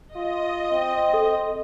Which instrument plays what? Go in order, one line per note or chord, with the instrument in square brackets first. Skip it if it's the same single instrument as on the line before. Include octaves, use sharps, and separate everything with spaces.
[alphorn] F4 [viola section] D#5
[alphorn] C4
[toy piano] A4